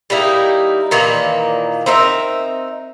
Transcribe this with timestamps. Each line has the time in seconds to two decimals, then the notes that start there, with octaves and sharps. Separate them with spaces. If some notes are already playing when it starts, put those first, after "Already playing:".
0.10 G3 A#3 D#4 E4
0.91 A#2 D#3 E3 A#3
1.86 C4 D#4 A#4 E5